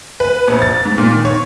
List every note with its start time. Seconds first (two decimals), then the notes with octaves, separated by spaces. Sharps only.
0.20 B4
0.48 A#1
0.62 A6
0.85 G#2
0.98 A#2
1.12 D#3
1.25 C#5